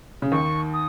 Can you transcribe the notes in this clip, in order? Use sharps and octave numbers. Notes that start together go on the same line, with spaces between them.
C#3
D#2 D#3 C#6
D#6